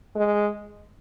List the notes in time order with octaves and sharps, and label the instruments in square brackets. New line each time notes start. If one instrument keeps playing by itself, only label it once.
[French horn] G#3